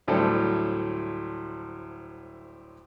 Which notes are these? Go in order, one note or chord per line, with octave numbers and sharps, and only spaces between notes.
D2 A2 F#3 G3 A4 C5